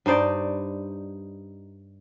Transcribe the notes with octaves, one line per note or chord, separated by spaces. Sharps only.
G2 D#4 C5 D5